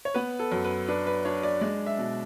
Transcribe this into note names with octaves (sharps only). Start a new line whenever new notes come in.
C#5
B3 B4
A4
F#2
B4
D4 B4
B4
D4 C#5
D5
G#3 D5
E5
B2